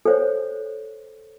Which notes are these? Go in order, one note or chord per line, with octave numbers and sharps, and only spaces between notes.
A4 C5 C#5